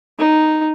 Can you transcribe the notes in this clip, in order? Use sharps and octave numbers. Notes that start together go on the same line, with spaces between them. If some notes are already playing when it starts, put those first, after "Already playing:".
D#4